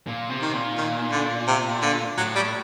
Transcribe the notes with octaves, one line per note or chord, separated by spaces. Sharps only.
A#2
C3
D#3
A#2
D#3
D3
C3
D3
A2 F#3
G3